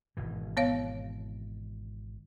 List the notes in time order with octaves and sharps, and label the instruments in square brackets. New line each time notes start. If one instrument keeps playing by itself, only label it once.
[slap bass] G#1 B2 E3
[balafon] B3 C#5 F5